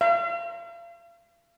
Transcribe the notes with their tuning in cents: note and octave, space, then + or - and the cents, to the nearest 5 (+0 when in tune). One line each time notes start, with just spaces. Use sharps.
F5 -40